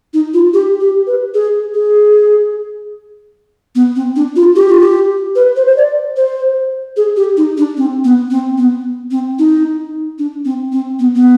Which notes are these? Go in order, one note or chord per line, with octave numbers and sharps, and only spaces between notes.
D#4
F4
G4
G4
B4
G#4
G#4
B3
C4
D4
F4
G4
F4
G4
B4
C5
C5
D5
C5
G#4
G4
D#4
D4
C4
B3
C4
B3
C4
D#4
D4
C4
C4
B3
B3